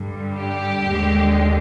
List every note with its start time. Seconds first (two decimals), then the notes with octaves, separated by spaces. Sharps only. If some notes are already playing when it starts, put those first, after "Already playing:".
Already playing: G2 D3 G3
0.36 G4
0.87 D#2 D3 G#3